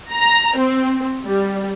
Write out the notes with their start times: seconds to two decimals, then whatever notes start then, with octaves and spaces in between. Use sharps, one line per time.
0.11 A#5
0.57 C4
1.26 G3